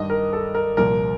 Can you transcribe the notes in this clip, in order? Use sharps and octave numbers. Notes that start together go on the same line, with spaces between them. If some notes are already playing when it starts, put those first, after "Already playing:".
Already playing: G2 D#3 D#5
A#4
A4
A#4
C2 A#2 F3 A#4